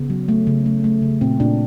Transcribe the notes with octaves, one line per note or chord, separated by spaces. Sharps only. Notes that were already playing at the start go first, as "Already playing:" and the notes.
Already playing: C#3 B3
F#3
A3
C#3
A3
A3
C#3
A#2 C4
A#2 D4